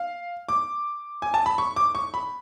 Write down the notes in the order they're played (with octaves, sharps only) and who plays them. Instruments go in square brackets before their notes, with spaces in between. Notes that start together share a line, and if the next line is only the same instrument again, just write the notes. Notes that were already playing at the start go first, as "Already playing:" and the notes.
Already playing: [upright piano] F5
D6
G#5
A5
B5
C#6
D6
C#6
B5